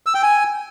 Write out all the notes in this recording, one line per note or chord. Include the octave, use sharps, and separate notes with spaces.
E6
G5
G#5